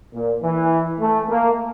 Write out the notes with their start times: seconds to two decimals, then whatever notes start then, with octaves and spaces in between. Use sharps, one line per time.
0.13 A#2
0.42 E3
1.00 A3
1.29 A#3